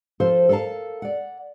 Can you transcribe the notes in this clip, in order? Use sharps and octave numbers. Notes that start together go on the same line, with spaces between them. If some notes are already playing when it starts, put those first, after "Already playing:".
F3 A4 C5
A4 A#4 D5 F5 A5
D5 F#5